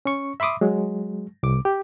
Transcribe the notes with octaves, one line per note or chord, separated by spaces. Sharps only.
C#4 C#6
E5 B5 C6 D6 D#6
F#3 G#3
C2 D6
G4